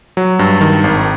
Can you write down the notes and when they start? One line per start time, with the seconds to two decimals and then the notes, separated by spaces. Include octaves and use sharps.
0.17 F#3
0.39 G2
0.61 D#3
0.84 G#1